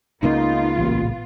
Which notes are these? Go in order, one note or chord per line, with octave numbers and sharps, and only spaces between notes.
C#2 C#3 A#3 B3 D#4 F4
A1 A#2